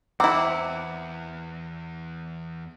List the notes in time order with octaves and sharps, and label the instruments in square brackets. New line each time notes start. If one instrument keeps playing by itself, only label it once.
[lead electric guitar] E2 [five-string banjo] C4 E4 [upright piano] F#5 [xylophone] A#5 D6 E6